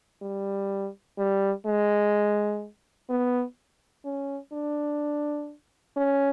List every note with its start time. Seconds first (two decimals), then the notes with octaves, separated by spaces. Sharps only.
0.22 G3
1.18 G3
1.66 G#3
3.09 B3
4.05 C#4
4.53 D4
5.97 C#4